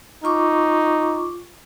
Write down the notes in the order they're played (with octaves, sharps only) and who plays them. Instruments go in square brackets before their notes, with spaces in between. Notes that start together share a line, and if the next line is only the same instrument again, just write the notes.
[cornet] D#4 [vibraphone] F4 C#6 D6